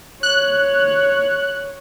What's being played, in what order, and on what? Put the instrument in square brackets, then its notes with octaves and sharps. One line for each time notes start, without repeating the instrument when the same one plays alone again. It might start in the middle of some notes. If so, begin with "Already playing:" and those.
[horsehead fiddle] C#5 [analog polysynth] F#6